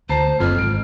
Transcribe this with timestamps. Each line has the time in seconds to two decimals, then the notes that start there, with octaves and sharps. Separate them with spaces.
0.09 D2 C5 A5 A#5 C7
0.40 F#1 F2 F6
0.58 G#1 D7